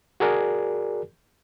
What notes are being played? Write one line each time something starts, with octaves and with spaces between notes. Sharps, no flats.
F#4 G#4 A#4 D5